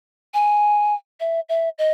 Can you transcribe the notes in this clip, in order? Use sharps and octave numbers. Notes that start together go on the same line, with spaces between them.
G#5
E5
E5
D#5